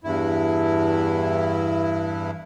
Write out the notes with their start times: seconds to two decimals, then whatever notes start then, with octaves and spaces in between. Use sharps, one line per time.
0.04 E2 G2 E4